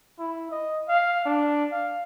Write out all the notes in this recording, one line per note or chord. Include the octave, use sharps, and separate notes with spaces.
E4
D#5
F5
D4
F5